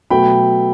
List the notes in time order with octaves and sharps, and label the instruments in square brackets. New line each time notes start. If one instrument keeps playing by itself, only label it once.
[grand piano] B2 F#3 A3 G5 B5